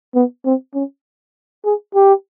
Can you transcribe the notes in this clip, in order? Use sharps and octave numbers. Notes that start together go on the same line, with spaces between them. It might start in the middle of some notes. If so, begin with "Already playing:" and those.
B3
C4
C#4
G#4
G4